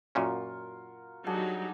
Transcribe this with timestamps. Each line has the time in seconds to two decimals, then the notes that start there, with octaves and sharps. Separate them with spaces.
0.15 F#2 A#2 C#4 F4 F#4 A#4
1.27 F#3 G3 D4 D#4 G#4 F#5